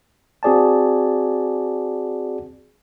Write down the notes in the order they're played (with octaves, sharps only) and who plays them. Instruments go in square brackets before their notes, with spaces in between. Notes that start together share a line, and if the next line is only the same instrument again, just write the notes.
[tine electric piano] C4 F#4 G#4 D5 G#5 A5